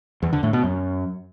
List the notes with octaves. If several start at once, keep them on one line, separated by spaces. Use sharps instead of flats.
E2
D3
A2
B2
F#2